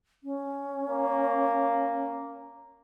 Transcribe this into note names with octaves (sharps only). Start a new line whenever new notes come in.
C#4
A#3